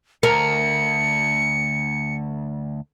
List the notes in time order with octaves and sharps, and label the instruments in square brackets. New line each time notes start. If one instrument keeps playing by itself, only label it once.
[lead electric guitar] D2 [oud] A#4 [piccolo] C#7